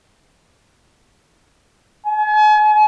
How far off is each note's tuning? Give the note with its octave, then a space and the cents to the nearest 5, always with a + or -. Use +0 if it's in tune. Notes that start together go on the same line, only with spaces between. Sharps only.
G#5 +40